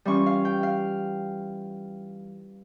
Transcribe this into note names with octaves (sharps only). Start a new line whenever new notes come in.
E3 G3 C#4 F4 C#6
F5
G5
F5